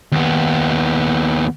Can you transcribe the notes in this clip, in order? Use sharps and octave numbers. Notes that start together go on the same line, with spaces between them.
D#2 B3